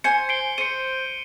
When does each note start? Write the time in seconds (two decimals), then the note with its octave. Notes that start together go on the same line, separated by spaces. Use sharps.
0.04 C5 G#5 C#7
0.29 C7 D7 G7
0.58 C5 C#7 D#7